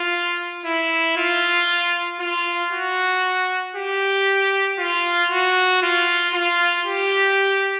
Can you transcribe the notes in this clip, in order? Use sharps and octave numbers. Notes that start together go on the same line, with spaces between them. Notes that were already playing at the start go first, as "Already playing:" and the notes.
Already playing: F4
E4
F4
F4
F#4
G4
F4
F#4
F4
F4
G4